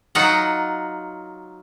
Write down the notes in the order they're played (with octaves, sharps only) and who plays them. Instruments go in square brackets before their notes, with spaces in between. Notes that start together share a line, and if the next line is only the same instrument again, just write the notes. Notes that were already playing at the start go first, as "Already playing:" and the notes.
[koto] F#3 D#4 F4 F#5